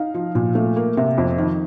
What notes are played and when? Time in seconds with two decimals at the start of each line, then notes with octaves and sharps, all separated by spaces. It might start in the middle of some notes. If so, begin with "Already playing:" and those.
Already playing: D#4 F5
0.14 F3
0.35 A#2
0.55 A3
0.76 A#3
0.97 C3
1.18 F2
1.38 D#3